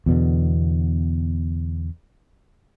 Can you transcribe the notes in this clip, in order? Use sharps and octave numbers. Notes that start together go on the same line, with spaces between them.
E2 B2 D3